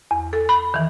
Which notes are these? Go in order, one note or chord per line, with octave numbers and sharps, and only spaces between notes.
E2
A4
B5
D#3 E3